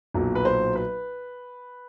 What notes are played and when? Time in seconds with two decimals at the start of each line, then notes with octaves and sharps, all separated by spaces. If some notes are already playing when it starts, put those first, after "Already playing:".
0.14 B1 A#2 F#3
0.35 B4
0.45 C5
0.75 B4